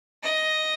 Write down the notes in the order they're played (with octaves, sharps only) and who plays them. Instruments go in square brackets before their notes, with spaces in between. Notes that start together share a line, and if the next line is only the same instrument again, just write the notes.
[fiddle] D#5